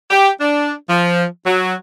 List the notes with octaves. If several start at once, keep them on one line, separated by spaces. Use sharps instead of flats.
G4
D4
F3
F#3